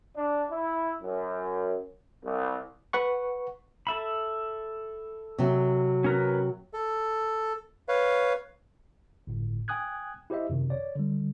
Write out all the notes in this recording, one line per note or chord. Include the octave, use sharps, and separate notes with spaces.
D4
E4
F#2
C2
B4 F#5 C#6
A4 E5 B5
C3 F#3
C#4 A#4 B4
A4
B4 C#5 F5
G1 A2
G5 G#5 D#6 F#6 G#6
E4 G4 C5 D#5 E5
F#2 C3 D#3
C#5 D5
D3 G3